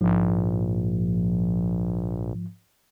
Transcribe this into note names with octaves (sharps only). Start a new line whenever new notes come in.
A#1 G#2 F3